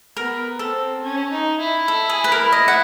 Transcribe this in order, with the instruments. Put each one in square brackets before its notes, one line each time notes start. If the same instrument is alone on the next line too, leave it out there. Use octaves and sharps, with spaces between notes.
[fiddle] B3 [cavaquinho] A#4
[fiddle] C4 [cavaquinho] A4
[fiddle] C#4
D#4
E4
[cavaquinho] A4
G#4
B4
A#4
D#5
F#5